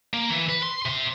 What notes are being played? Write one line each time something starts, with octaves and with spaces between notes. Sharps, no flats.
A#3
E3
B4
C6
C3 C6